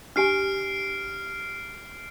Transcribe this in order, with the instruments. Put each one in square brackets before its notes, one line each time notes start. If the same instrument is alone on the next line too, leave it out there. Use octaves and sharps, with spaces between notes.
[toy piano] D4 G4 G#5 [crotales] F6 C7 D7